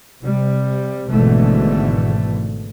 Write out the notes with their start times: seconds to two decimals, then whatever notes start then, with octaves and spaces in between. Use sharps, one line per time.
0.22 C3 G3
1.11 G#1 G#2 B2 D3 E3 A3